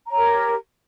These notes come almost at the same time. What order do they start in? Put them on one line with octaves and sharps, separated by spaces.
A#5 C#5 G4 A#4